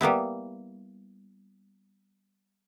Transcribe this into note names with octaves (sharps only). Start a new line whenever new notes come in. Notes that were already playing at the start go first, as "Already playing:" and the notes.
G3 A#3 B3 E4